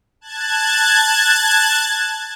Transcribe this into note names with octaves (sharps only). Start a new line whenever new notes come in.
A5 F#6 G#6 A6